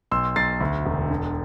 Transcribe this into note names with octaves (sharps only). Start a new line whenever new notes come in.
B1 C6 E6
B1 A6 C7
D2
E1
D3